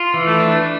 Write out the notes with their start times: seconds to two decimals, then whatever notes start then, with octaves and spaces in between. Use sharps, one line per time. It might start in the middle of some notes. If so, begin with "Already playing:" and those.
Already playing: F4
0.14 E3
0.26 A3
0.40 D4